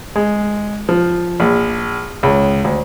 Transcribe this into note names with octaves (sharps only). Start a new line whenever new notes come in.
G#3
F3
A#1
C#2
D2